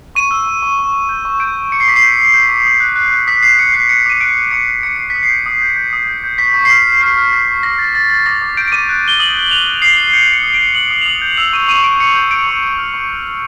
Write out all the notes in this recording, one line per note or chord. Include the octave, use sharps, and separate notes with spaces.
C#6 D#7
E6
C#6
C#6
C#6
C#6
G6
C#6
G6 D7
G6
D6 C#7
C7
D6 B6
C7
G6
G6
G6
D6
D#6
F#6
F#6
F#6
D#6 B6
D#6 C7
D#6 C#7
F#6 C7
F#6 C#7
D6 D#7
F#6 D7
F#6
D6 C#7
F#6
D6 C#7
D6 C7
D#6 B6
C7
G6
D#6
G6
G6
D#6
G6
G6
C#6 B6
C#6
C7
F6 B6
F6
F6 C7
F6
F6 B6
C#6
D6 A#6
G6 A6
D6 A6
G6 A6
D6 A#6
D6
G6 D7
D7
D6 D#7
F#6
F#6 G7
D#6 F#7
F#6
F#6 F7
F#6
D#6 C7
D#6
G6 C#7
G6
C#7
D#6
D7
G6
D#6 F#7
D#6
F7
D#6 F#7
G6
E6 F7
C#6 D#7
C#6 D#7
C#6 D7
C#6 C#7
G6
G6 D7
C#6
C#6
F6
C#6